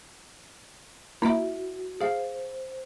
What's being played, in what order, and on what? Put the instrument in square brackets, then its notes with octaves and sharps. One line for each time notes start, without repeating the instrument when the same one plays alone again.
[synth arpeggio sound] A#3 B5 D7 [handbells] E4 E5 [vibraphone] F#4
[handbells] G#4 F5 [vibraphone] C5